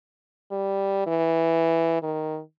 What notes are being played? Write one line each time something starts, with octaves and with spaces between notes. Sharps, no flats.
G3
E3
D#3